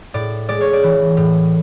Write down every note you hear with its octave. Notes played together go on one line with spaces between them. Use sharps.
A2 D5
G#3 D5
C#5
D5
E3
A2